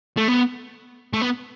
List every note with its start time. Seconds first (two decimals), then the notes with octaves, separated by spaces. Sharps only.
0.17 A3
0.28 B3
1.13 A3
1.21 B3